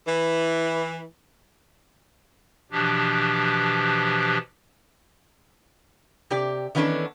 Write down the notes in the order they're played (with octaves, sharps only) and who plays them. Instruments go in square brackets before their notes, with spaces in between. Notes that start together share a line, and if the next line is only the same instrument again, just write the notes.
[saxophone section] E3
[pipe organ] B2 E3 F3 D4 G4
[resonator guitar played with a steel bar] C3 G4 D5
D#3 E3 B3 C#4 D4 A4